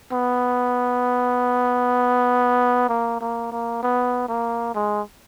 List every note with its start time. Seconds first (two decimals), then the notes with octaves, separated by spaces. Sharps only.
0.13 B3
2.89 A#3
3.21 A#3
3.52 A#3
3.83 B3
4.28 A#3
4.75 G#3